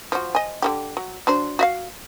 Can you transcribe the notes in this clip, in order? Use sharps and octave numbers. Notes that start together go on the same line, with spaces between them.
F3 F#4
D#5 G#5
D3 E3 G4
F#3
F#3 D4 C5
F#4 E5 F5